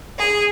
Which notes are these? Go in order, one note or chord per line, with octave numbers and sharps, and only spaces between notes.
G#4